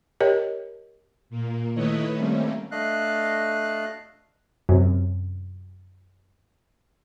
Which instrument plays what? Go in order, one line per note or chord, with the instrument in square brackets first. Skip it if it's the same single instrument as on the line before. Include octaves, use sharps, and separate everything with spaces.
[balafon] G4 A#4 C#5 D#5 G5
[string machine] A#2 A#3
D#3 A3 E4 B4 C#5 D#5
D#3 G3 A3 A#3 C4 C#4
[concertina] A3 D4 D#5 F5 F#6
[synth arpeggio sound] F#2 C3